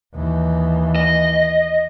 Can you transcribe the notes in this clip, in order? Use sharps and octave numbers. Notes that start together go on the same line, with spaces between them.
D#2 E3
D#5